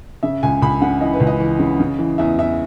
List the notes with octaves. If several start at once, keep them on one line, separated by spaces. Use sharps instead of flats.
C#3 E5
C#2 G#5
C#2 B5
C#3 F#5
E3 D#5
B4
C#2
D#5
E3
C#3
C#3
E3
E2 E5
E2 E5